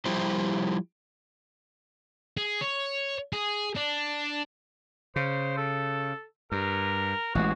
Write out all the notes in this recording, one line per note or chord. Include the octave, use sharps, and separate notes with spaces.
F3 G3 E4 G4 C5
G#4
C#5
G#4
D4
C#3 C5
A4
G2 A#4
A1 E3 G#3 F#4